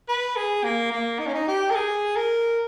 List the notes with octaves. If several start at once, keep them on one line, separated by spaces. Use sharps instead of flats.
B4
G#4
A#3
A#3
D#4
C#4
D#4
G4
A#4
G#4
A#4